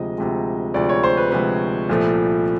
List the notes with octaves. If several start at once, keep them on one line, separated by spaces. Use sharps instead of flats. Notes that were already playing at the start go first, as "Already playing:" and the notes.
Already playing: D2 C3 F3 G#3 D#5
D2 C3 F3 G#3
D2 C3 F3 G#3 D5
C#5
C5
B4
D2 C3 F3 G#3 B4
C2 A#2 F3 A3